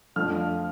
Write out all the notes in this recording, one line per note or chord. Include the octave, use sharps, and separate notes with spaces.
F2 D3 F3 A3 F6